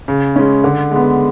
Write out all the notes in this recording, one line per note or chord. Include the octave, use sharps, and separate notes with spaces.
C#3
G#3 C#4
D3
G#3 B3